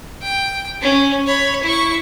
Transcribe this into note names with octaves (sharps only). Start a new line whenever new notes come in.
G5
C#4
C#5 B5
E4 C#6